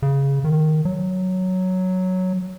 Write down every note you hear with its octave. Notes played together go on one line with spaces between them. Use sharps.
C#3
D#3
F#3